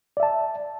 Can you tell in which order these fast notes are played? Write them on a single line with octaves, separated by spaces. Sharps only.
D5 E5 A5